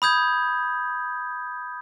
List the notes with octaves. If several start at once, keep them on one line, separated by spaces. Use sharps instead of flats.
B5 D#6 G6 G#6